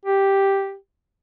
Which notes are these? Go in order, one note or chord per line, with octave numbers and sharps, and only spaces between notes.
G4